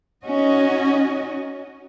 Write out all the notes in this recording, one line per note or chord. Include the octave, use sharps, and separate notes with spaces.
C#4 D#4 F#4 D#5